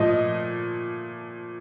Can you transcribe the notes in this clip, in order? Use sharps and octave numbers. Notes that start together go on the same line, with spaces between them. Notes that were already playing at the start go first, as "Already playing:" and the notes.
Already playing: A#2 F3 A3 D#5